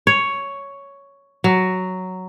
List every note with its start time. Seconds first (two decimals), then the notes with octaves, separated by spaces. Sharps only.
0.07 C#5
1.44 F#3